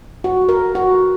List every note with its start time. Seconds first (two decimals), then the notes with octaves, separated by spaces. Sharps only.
0.24 F#4
0.49 A#4
0.75 F#4